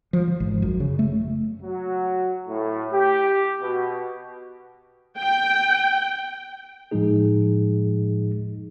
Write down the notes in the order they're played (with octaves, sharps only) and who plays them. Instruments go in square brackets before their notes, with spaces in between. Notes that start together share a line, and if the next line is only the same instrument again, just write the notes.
[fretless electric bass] F3
F3
G#1
F#2
C#3
A3
[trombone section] F#3
A2
G4
B2
[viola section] G5
[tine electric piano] A2 F3 G#3 D#4 G#4